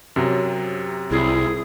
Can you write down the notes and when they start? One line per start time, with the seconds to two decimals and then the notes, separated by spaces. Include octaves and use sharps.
0.16 F#2 C3 F#3
1.11 C2 E4 G#4